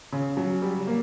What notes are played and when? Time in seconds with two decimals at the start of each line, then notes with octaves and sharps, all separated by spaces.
0.12 C#3
0.37 F#3
0.62 G3
0.87 A#3